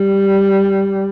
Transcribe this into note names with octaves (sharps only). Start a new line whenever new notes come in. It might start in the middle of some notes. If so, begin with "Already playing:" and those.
Already playing: G3